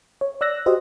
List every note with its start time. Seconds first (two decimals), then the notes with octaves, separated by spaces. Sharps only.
0.21 C#5
0.41 D5 E6 F#6 A#6
0.66 F#4 G4 C5 D#5